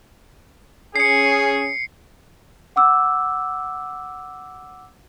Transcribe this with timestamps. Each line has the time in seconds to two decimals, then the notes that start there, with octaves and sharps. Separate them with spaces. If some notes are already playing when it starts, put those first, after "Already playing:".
0.96 C#4 G#4 C7 C#7
2.76 F#5 D6 E6